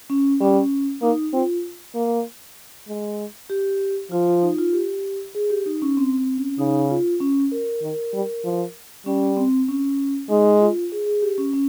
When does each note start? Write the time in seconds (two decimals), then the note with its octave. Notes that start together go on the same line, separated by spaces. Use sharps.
0.10 C#4
0.41 G3 C#4
1.02 A#3 D#4
1.33 C4 F4
1.95 A#3
2.88 G#3
3.50 G4
4.11 F3 F4
4.27 F4
4.42 D#4
4.58 F4
4.73 G4
5.35 G#4
5.50 G4
5.66 D#4
5.82 C#4
5.97 C4
6.18 C4
6.38 C#4
6.58 C#3 D#4
6.90 F4
7.20 C#4
7.52 A#4
7.82 D#3
8.13 G3
8.44 F3
9.06 G3 C#4
9.37 C4
9.68 C#4
10.29 G#3 D#4
10.60 F4
10.92 G#4
11.06 G#4
11.22 G4
11.38 C#4
11.53 C#4